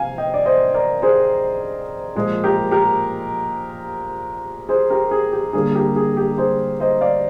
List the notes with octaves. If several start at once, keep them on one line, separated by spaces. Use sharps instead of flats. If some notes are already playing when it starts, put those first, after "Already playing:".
Already playing: C3 F3 F5 G#5
D#5 G5
D5
C5 D#5
A#4 D5
G#4 C5
A#2 F3 G#3
G4 A#4
G4 A#4
G#4 C5
G4 A#4
G#4
G4
D3 G3 A#3 G#4
G4 A#4
G#4
G4 A#4
G#4 C5
C5 D#5
D5 F5